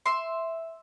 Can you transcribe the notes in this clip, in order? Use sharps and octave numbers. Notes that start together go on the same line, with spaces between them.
E5 C6